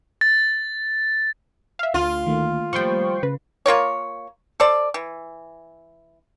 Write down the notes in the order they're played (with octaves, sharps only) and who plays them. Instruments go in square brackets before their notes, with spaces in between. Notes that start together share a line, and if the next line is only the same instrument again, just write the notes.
[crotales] A6
[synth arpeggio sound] E5 F5
[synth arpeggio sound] D2 [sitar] F4
[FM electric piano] D#3 A3 A#3
[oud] F3 G3 [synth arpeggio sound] G5 C6 C#6
[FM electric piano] C#3 [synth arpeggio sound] B4
[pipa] A#3 F4 A#4 C#5
A4 C5 D5
E3